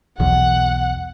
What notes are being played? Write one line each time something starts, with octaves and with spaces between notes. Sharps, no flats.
B1 E2 F#5